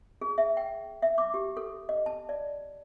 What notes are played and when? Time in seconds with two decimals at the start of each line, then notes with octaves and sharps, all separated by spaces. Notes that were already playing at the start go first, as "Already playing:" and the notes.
0.21 G#4
0.38 E5
0.57 G5
1.02 E5
1.18 D6
1.34 G4
1.57 A4
1.89 D#5
2.06 A5
2.29 D5